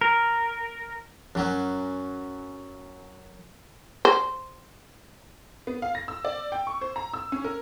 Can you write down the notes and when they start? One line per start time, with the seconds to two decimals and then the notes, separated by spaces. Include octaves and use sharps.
0.01 A#4
1.35 F#2 F#3 C#4
4.05 C5
5.67 B3
5.82 F5
5.95 A#6
6.08 E6
6.25 D5
6.52 G5
6.67 C#6
6.81 C5
6.96 A#5
7.14 E6
7.32 C#4
7.44 A#4